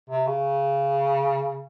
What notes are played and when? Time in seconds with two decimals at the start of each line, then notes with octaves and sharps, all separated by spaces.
0.09 C3
0.26 C#3